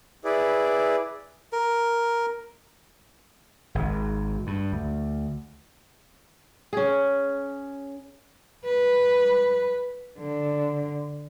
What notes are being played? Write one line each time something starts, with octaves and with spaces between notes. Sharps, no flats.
E4 G#4 B4 D5
A#4
G#1
G2
D2
C#4 G#4
B4
D3